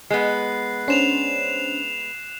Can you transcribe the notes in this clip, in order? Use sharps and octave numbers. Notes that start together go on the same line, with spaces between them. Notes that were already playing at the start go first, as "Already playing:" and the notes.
G#3 B3 F#6 C7
C#4 D4 C5 C7 E7 F7